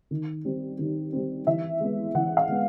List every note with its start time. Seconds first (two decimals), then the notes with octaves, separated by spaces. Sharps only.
0.11 D#3
0.45 G3 C4
0.79 D#3
1.13 G3 C4
1.47 E3 E5
1.80 G#3 B3
2.15 E3 F#5
2.37 F5
2.48 G#3 B3